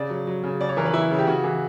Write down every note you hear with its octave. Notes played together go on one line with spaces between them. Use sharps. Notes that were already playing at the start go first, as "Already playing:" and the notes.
Already playing: C#3 D5
F#3
F#3
C#3
C#3 D5
C#5
E3 A#4
B4
E3 E4
C#3
G4
C#3 F#4
E3